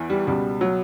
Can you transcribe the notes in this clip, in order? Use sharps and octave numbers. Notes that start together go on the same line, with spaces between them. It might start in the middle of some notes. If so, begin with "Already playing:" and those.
Already playing: E2 E3
G3
C#2 B2 G3
F#3